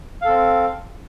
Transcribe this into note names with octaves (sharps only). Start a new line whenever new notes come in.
C4 A4 F5